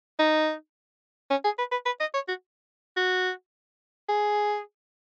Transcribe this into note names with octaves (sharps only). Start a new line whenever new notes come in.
D#4
C#4
G#4
B4
B4
B4
D#5
C#5
F#4
F#4
G#4